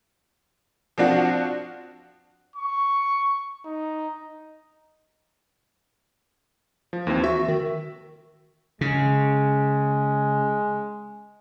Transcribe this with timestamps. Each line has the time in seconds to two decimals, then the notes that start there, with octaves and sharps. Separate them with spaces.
0.98 F3 C4 D4 F#4
2.56 C#6
3.65 D#4
6.93 F3
7.07 D#2 E3 C4
7.24 F#4 E5
7.48 D#3
8.81 C#3 G#3